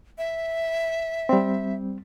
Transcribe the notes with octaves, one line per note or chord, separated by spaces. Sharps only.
E5
G3 C4